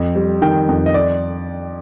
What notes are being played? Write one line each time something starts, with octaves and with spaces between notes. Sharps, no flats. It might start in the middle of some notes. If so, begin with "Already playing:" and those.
Already playing: F2
G3
D#3 G5
F2
D#5
D5